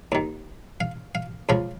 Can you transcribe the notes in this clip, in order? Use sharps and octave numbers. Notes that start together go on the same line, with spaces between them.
D#2 D#3
F5
F5
C#2 C#3 F3 F5